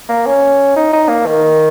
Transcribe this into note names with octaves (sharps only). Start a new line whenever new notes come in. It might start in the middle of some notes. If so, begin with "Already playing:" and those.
A#3
C#4
D#4
D#4
A#3
D#3